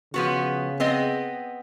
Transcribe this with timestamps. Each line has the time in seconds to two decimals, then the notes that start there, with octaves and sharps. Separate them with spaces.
0.14 C#3 F3 B3 F#4
0.80 B3 C4 D#5